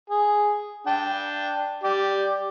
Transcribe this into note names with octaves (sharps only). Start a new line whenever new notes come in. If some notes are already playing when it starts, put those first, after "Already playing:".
G#4
D4 G5
G4 D5